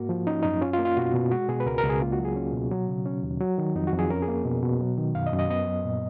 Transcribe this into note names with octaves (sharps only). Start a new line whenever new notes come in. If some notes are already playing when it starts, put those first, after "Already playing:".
Already playing: G#2 A#3 F#4
F3
C#4 D#4
F#2 D#4
C#4 F4
F4
A#3
F4
B2 F#4
B2
G#3 F#4
B2 G#4
B4
C#2 A#4
A#4
C#2
G#4
A#3 F4
F#4
F#3
G#4
C#4
B2
F#3
C#3
C#4
D#2
F#3
D#3
F2 D#4
F#4
F2
G#4
C#4 A#4
G#4
A#3
B2
B2
F#3
D#3
F#2 F5
D#5
F#2
D#5
B3 D#5
F#3
A#2